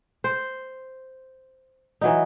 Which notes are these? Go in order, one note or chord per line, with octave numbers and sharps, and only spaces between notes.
C5
E3 F#3 D#4